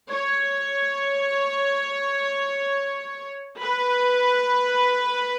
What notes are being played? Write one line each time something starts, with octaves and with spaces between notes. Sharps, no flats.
C#5
B4